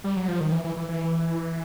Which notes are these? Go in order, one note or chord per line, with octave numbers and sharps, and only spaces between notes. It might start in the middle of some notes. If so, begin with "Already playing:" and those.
G3
F#3
F3
D#3
E3
E3
E3
E3